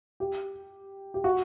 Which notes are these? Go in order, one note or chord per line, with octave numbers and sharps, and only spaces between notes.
G4
G4
F#4